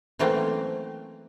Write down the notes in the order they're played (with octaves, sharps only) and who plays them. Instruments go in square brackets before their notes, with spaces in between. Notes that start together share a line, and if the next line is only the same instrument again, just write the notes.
[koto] E3 F#3 A3 A#3 C4 C#4